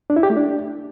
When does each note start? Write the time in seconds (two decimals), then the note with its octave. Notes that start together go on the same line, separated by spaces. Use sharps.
0.10 D4
0.16 E4
0.23 G4
0.30 A3
0.37 D4